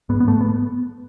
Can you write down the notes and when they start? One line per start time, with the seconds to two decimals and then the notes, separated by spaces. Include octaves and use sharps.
0.09 G#2 B3
0.20 B3
0.27 G#2 A3
0.41 B3